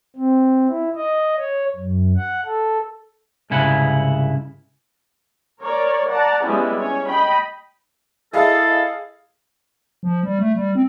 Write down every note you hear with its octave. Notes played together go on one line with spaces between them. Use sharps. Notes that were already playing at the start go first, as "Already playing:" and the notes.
C4
E4
D#5
C#5
F#2
F#5
A4
C2 G#2 C#3 E4 F#5
A#4 C#5 D5
D5 F#5 A5 A#5
G3 G#3 B3 C#4 E4 G4
C#4 C#5
D#5 G5 B5
E4 G#4 A4 D#5 F5
F3
G3
A3
G3
C4